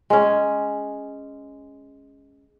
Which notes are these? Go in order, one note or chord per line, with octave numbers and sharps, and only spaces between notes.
G#3 C#4